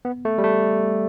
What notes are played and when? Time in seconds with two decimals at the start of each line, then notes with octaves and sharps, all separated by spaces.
0.05 B3
0.25 A3
0.38 G3
0.44 A3